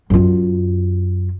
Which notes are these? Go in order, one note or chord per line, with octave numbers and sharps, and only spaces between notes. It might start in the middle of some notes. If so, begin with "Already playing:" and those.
F#2 F4